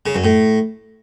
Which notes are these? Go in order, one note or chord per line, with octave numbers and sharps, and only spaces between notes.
C#3
F#2
A2